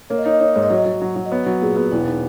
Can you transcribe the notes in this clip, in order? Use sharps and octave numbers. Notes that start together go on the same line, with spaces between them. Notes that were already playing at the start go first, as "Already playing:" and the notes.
A#3 C#5
D#5
D#4 C#5
D#5
D#4 C#5
D#5
G#2 C#5
D#5
F#3 C#5
D#5
F#3 C#5
F#3
F#3
D#5
B3 C#5
F#3
A#2 G#4
B3 G#4
E1 E4
D#4